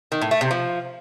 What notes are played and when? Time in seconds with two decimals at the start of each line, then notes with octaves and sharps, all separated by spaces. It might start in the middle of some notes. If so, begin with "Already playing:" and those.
0.12 D#3
0.21 A2
0.31 A3
0.41 C3
0.51 F3